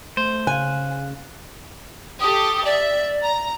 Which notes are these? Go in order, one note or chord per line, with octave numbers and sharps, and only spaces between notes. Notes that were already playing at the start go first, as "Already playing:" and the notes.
A3 C5
C#3 F5 G#5 F#6
G4 A4 D#6
D5 E5
A#5